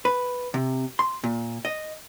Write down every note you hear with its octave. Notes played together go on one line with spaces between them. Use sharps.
B4
C3
C6
A#2
D#5